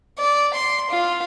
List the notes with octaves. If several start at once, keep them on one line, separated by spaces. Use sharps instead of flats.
D5
C6
F4